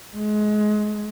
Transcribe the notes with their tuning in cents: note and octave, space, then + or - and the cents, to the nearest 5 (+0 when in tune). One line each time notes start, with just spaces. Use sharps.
G#3 +25